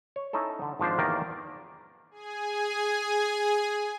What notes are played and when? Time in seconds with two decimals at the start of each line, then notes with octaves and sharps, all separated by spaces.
0.16 C#5
0.33 C#4 D#4 E4 A4
0.62 D3
0.79 G#1 F3 D4 C5
0.98 E2 D#3 A#3 G4 A#4 D5
2.11 G#4 G#5